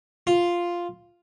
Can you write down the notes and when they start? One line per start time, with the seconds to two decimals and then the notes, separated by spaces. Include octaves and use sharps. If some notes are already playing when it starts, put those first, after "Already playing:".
0.27 F4